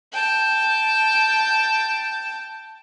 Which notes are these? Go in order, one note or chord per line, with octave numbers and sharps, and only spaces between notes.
G5 A5